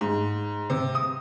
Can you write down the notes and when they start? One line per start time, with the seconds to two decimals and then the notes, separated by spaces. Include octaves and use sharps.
0.01 G#2
0.70 C3
0.95 D#6